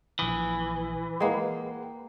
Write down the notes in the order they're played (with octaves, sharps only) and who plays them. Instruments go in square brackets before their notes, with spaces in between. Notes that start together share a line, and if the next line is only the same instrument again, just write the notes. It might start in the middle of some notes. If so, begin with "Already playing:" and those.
[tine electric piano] A#1 D#6 [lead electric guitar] E3
[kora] G#3 A#3 [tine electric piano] B4 F#5 G5